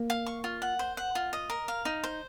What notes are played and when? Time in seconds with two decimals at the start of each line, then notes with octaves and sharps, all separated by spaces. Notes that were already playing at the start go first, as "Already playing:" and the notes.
Already playing: A#3
0.10 F5
0.26 C#6
0.44 F4
0.62 F#5
0.79 C5
0.97 F#5
1.15 F4
1.33 D#5
1.50 A#4
1.68 F5
1.85 D#4
2.04 C5